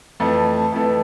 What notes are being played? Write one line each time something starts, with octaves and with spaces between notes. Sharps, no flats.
F2 E3 A3
F2 E3 A3